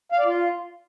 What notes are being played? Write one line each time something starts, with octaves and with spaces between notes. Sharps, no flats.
F5
D5
F4